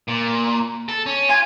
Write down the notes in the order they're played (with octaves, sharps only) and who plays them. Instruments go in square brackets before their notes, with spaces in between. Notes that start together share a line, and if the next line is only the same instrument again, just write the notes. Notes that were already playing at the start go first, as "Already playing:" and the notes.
[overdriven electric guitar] A#2
A4
C#4
[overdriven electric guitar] F4 [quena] G#5